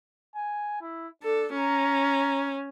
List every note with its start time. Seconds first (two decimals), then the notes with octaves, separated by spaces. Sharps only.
0.35 G#5
0.82 E4
1.23 D4 A4
1.53 C#4 A#5